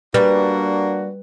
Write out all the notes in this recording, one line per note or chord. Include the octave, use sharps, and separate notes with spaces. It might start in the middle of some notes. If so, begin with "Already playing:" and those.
G3 A#3 D4 F#4 B4